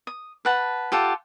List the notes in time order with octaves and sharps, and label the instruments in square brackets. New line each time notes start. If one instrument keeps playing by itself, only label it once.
[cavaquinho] D#6
B4 F#5 A5
F4 G4 A4 F#5